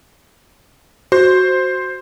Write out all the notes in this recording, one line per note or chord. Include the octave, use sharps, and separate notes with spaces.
F#4 C5